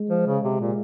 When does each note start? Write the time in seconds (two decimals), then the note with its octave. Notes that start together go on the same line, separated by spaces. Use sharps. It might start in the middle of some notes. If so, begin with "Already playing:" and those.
Already playing: G#3
0.10 F3
0.26 C#3
0.44 C3
0.60 A#2